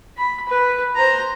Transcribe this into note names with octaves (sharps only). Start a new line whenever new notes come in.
B5
B4
C5 A#5